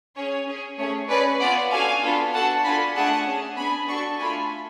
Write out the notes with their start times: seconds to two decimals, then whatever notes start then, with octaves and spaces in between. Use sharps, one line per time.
0.15 C#4 G#4 C#5
0.47 C#4 G#4
0.78 A3 C#4 G#4 C#5
1.09 C#4 G#4 B4 D5
1.40 B3 F4 G#4 D5 F#5
1.71 D4 F#4 A4 F5 G#5
2.02 B3 D4 F4 A4
2.33 D4 F#4 A4 F#5 A5
2.64 D4 F4 A4 G#5 B5
2.95 A3 D4 G#4 F#5 A5
3.26 C#4 G#4
3.57 B3 D4 G#4 G#5 B5
3.88 D4 F#4 A4 A5 C#6
4.19 A3 D4 F4 A4 G#5 B5